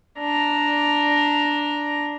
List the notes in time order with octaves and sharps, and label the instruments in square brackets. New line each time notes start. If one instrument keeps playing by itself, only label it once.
[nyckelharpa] D4 A#5